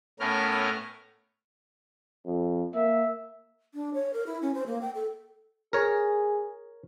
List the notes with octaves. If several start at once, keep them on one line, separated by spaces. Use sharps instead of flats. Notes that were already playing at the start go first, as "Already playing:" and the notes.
A2 A3 B3 C#4 A#4 F6
F2
A#3 E5
D4
C#5
A#4
E4
C#4
C5
A#3
G5
A4
G#4 A#4 C#5